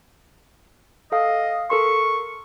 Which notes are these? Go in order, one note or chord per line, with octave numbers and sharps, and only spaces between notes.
A4 D#5 F5
A4 A#4 C6 C#6